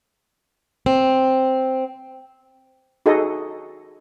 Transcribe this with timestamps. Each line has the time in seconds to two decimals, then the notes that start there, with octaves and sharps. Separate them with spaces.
0.86 C4
3.06 D#4 F#4 G#4 A4 D#5